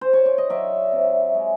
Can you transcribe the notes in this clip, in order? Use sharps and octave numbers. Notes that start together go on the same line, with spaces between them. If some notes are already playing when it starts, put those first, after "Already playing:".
C5
C#5
D5
D#5
F#3 D5 E5
C3
G#3